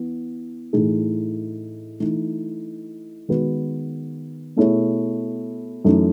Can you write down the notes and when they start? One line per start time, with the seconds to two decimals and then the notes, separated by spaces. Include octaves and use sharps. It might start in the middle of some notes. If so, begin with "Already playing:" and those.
Already playing: E3 B3
0.73 A2 E3 A3 D#4 G#4
2.00 E3 A3 D#4
3.28 D#3 G#3 B3 F#4 B4
4.57 B2 A3 E4 G#4 C#5
5.84 F#2 E3 A3 D#4